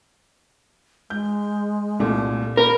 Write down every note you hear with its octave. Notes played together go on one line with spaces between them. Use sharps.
G#3 G6
C2 A#2 A3
A#3 A#4 B5